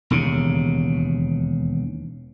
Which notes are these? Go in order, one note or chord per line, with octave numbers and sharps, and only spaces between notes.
E1 D#2 C#3